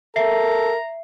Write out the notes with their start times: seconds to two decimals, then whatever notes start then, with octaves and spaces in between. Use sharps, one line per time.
0.16 A4 A#4 E5 A#5 C7